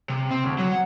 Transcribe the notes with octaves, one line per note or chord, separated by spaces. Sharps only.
C3
C4
D2
F#3
F#5